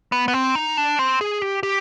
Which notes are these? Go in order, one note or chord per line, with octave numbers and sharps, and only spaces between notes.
B3
B3
C4
D#4
D4
C4
G#4
G4
G4